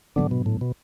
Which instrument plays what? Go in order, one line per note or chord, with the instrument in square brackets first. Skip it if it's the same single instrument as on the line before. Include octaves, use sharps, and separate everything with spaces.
[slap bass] G#2 F#3 B3 D4 [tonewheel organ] D3
[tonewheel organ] B2
A2
B2